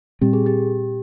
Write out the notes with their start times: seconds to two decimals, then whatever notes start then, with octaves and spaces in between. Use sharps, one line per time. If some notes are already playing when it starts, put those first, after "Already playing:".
0.21 A#2 G3 C4 G4
0.33 G#4
0.46 G4